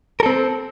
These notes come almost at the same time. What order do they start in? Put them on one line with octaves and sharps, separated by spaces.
A#4 A4 C4